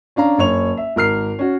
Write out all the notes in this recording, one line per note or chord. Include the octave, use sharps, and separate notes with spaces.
C#4 D4 F5 A#5
F#1 C#5 C#6 F7
E5
G#1 A#4 F6 C7
C#4 F#4